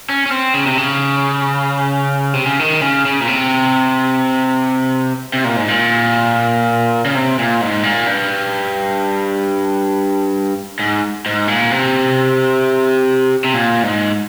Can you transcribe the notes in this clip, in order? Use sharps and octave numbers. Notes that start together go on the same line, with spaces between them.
C#4
C#4
C4
C#3
C3
C#3
C3
C#3
D#3
C#3
C#3
A#2
C3
C3
A#2
G#2
A#2
C#3
C3
A#2
G#2
A#2
G2
G#2
G#2
A#2
C3
C3
A#2
G#2